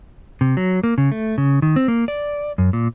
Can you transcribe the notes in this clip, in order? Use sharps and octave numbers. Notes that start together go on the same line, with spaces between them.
C3
F#3
A#3
C#3
A3
C#3
D#3
C4
A#3
D5
F#2
A#2